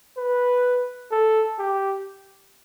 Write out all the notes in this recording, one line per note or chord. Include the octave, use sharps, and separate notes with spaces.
B4
A4
G4